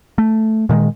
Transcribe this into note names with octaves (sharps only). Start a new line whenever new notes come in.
A3
A#2 D#3 G#3